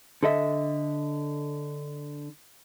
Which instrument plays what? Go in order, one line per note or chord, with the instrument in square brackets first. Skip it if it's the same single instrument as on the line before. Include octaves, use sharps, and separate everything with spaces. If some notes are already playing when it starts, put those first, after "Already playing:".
[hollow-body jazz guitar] D3 A4 D#5 E5